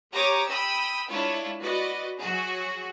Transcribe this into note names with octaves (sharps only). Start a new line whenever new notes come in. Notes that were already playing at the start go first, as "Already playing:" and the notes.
G4 C#5 A#5 D6 D#6
G5 B5 D#6 E6
G#3 D4 E4 F4 C#5
F#4 B4 D5 D#5
F#3 F#4 G#4